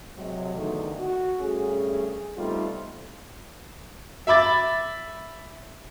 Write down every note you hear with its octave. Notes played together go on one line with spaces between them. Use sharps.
C3 F#3 G#3
E2 D3 D#3 A3 D#4
F#4
G2 A3 C#4 G#4
G3 A3 B3 C4 D#4 F4
E5 B5 D6 A6